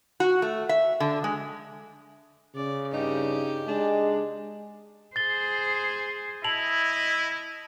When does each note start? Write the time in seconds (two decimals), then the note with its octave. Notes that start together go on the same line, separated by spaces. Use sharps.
0.20 F#4
0.42 A3
0.69 E5
1.00 D3
1.24 G#3
2.56 C#3 D5
2.93 G2 D#4 G4
3.67 G#3 D4
5.16 G#4 C5 A6 G7
6.44 E4 D#5 A5 F7 F#7